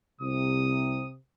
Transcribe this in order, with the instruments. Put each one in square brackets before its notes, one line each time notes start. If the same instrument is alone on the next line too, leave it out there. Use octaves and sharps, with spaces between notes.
[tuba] C2 [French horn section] C3 [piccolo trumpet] D#6